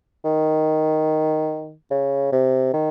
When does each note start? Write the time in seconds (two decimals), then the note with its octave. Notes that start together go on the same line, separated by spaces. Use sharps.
0.24 D#3
1.91 C#3
2.33 C3
2.74 D#3